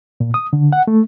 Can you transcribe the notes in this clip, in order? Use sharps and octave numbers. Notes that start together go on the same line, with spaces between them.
A#2
D#6
D3
F#5
A3